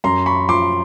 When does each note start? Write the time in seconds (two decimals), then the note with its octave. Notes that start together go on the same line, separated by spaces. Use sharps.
0.04 F#2 A#5 C6
0.26 B5 C#6
0.49 F3 C6 D6